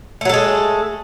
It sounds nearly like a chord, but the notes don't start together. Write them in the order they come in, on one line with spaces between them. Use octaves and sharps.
A3 F#3 A4 G#3